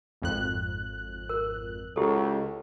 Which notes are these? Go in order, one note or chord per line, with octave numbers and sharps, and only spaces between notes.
G#1 F2 F#6
A#4
C#2 E4 G4 A4